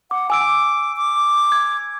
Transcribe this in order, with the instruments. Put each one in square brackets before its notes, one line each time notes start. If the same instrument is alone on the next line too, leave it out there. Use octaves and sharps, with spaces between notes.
[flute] F#5 [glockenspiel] D6
[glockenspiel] G#5 E6 D7 [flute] D6
[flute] D6
[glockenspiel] G#6